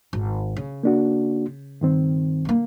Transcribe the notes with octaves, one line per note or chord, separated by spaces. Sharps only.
G#1
C#3
A#3 D4 F#4
G2 D#3 C4
D3 A#3